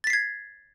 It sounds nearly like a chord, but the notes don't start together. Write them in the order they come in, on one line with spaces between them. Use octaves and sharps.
A6 B6 C7 G#6